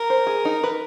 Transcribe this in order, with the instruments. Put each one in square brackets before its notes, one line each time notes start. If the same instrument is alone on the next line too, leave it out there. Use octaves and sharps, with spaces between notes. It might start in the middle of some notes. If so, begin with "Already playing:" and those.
Already playing: [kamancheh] A#4
[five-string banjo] C5
G#4
D#4
B4